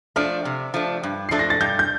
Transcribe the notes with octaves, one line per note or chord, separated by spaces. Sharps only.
F3 A3 D4 F6
C3
F3 A3 D4
G2
F3 A3 D4 A4 C7
A#6
A6
G2 G6
G6